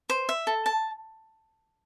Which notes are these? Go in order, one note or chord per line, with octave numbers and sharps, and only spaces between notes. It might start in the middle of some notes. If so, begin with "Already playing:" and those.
C5
E5
A4
A5